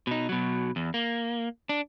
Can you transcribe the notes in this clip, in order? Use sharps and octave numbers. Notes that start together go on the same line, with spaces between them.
B2 D#4
B2 F#3
E2
A#3
D4